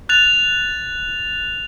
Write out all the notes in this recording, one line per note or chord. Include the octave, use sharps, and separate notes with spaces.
F#6 A6 F7